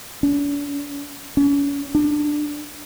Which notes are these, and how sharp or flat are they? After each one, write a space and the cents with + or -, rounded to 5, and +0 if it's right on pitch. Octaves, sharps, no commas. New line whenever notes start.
D4 -45
C#4 +35
D4 +15